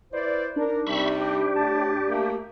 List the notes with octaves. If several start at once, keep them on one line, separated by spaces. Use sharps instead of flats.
E4 B4 C5 D5
D4 D#4 A#4
C3 G3 E5 B5 C#6
G4
A2 A5
A3 A#3